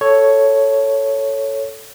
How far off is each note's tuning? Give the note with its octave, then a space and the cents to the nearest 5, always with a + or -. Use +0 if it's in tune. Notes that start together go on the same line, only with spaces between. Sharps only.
A4 +0 C#5 +0